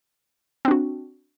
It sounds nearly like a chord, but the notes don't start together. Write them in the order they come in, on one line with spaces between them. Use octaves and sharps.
C4 D4 F#4